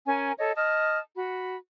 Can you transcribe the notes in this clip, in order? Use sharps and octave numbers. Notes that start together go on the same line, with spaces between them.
C#4 A#4 G#5
A4 C#5 D#5
D#5 A5 D#6 F6
F#4 B5